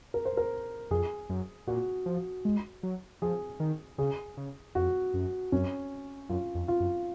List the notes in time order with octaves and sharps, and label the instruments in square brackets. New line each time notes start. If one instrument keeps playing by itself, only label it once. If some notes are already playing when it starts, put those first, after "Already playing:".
[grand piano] A#4
C5
A#4
[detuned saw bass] F2 [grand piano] G#4
[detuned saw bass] F#2
[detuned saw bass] A#2 [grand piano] F#4
[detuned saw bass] F3
G#3
F#3
[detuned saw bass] F3 [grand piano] G#4
[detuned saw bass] D#3
[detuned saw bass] C#3 [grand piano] G#4
[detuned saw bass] C#3
[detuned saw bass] F2 [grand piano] F#4
[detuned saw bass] F#2
[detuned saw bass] F#2 [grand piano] C#4
[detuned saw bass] F#2 [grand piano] F4
[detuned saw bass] F2
[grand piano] F4
[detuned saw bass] F#2